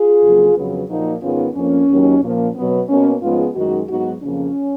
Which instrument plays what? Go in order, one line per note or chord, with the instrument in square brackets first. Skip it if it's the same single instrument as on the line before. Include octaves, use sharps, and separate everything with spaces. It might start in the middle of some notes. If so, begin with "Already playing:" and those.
Already playing: [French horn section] F4 G#4
F2 C#3 F#3 A#3
F2 C#3 F#3 B3
A#2 F3 A#3 D#4 F#4
G#2 D#3 G#3 B3 C#4 F4
F2 F3 A#3 C#4
D#2 D#3 F#3
A#2 F3 A#3
B2 F#3 B3
B2 A#3 C#4
G#2 F3 G#3 B3 C#4 F4
F#2 D#3 G#3 D#4 F#4
G#2 F#3 B3 D#4 F#4
F2 C#3 F3 A#3 C#4